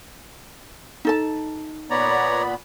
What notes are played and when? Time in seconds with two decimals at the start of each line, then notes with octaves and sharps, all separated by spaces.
1.05 D#4 A4 A5
1.90 A#2 B3 C#5 D5 A#5 B5